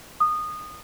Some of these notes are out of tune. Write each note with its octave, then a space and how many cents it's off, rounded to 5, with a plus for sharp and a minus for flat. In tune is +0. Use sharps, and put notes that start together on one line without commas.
D#6 -20